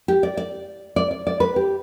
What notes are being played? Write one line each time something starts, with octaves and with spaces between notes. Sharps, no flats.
G4
D5
D5
D5
D5
D5
B4
G4